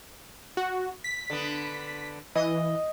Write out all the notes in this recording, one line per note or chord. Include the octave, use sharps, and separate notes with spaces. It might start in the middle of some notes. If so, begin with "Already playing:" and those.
F#4
B6
D3 B3
E3 D#5